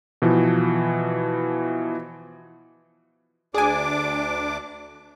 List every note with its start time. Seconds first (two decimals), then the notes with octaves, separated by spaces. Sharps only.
0.22 B2 E3 F3
3.54 D2 D4 G#4 G#5 D6